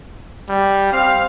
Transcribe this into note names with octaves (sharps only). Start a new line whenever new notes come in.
G3
C4 F5